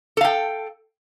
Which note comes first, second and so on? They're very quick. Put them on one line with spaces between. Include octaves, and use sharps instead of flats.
A4 F5 G5